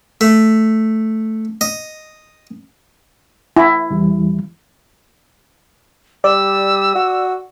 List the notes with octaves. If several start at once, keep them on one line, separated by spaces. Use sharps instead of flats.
A3
D#5
E4
E2 E3 G3
G3 D5 E6
F#4